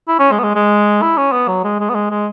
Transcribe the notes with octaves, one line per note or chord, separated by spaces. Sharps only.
E4
C#4
G#3
B3
G#3
G#3
E4
C#4
B3
F#3
G#3
G#3
B3
G#3
G#3